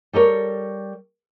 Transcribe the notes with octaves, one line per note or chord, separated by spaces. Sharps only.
G3 A4 A#4 C#5